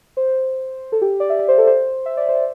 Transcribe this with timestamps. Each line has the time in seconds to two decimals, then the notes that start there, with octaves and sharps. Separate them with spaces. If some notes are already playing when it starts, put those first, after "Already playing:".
0.17 C5
0.92 A4
1.02 G4
1.20 D5
1.30 E5
1.39 D5
1.48 C5
1.58 A4
1.67 C5
2.06 E5
2.17 D5
2.29 C5